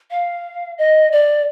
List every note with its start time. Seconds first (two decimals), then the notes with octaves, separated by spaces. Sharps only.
0.10 F5
0.78 D#5
1.12 D5